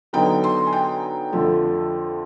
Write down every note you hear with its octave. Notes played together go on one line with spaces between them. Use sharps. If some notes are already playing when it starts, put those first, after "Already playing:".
D3 F#3 B3 D#4 G5
C6
G#5
G5
F2 D3 F3 A3